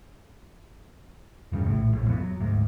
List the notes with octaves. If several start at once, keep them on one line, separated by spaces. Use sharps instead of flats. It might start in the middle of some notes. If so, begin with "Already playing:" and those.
E1 G2 C#3
A#1 A2
A#1 A2
F2 F3 B3
F#3
D2 G#2